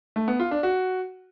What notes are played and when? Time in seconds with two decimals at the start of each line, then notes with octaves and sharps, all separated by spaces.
0.16 A3
0.28 B3
0.40 F4
0.51 D4
0.63 F#4